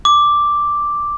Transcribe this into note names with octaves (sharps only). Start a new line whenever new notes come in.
D6